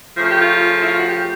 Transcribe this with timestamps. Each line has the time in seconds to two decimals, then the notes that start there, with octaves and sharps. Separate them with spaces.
0.17 C#3 F3 A3
0.28 G4
0.39 F4
0.81 E4
0.84 F4
0.96 F#4
1.08 G4
1.18 G4